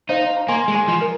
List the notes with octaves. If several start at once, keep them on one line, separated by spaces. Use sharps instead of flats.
D#4 C5 F5
A#5
A#3 G#5 C6
G#3
G#5 C6
F3
A#4